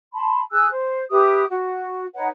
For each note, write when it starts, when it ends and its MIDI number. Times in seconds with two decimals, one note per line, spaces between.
0.13 0.40 81
0.13 0.40 83
0.13 0.40 84
0.51 0.67 68
0.51 0.67 80
0.51 0.67 88
0.51 0.67 90
0.71 1.04 72
1.10 1.43 67
1.10 1.43 71
1.10 1.43 76
1.10 1.43 87
1.49 2.05 66
2.15 2.27 63
2.15 2.27 71
2.15 2.27 73
2.15 2.27 78